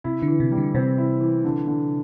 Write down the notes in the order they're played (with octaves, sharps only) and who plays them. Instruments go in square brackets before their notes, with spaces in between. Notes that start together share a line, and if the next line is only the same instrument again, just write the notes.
[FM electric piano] C3 [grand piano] E4
[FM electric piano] D3
[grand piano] E3
[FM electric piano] C3
[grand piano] G3
[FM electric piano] D3
[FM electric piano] C3 [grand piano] C4
[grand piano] E4
E3
D3
D3